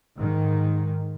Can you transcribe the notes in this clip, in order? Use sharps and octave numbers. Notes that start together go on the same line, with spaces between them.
G#2 D#3